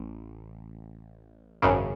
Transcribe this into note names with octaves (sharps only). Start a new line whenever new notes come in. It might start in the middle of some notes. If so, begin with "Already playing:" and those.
Already playing: A1
G#1 F#2 C#3